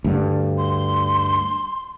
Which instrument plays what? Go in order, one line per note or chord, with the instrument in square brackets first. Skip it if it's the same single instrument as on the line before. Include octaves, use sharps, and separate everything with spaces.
[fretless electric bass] D2 G2 D3
[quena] C6